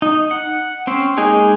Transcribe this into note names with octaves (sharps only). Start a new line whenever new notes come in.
D#4
F#5
C4 C#4 C5
G#3 A#3 D#4 G#4